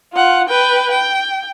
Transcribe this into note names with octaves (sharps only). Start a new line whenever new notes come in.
F4 F#5
B4 G5
G5